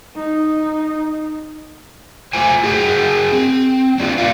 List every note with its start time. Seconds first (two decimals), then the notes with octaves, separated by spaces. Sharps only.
0.15 D#4
2.33 A3 F4 C5 G#5
2.63 F#4 G#4 A#4 F#5 G5
3.33 C4
3.98 C4 D4 E4 F4
4.18 A#3 B4 D5 F5